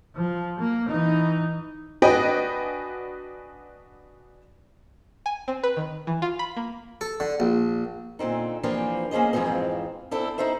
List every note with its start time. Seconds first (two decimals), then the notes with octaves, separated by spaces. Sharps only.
0.15 F3
0.59 A#3
0.89 E3 D#4
2.02 D4 F#4 B4 D#5 G5 G#5
5.26 G#5
5.48 C4
5.63 B4
5.77 D#3
6.07 E3
6.22 F4
6.39 B5
6.57 A#3
7.01 A4
7.20 D3
7.40 A#1
8.19 A#2 D3 C4 D#4
8.63 E3 F3 A#3 C4 D4 G4
9.11 A#3 C#4 G#4 C5 D#5
9.33 F2 G#2 C#3 E3 F3 C4
10.11 C4 D4 E4 A4
10.38 D#4 E4 A4 C5 E5